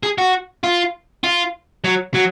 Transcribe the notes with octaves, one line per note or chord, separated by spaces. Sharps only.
G#4
F#4
F4
F4
F#3
F#3